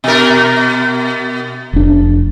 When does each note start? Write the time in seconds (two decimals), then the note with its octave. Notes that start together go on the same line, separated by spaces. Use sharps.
0.04 B2 A#4
1.73 F1 D4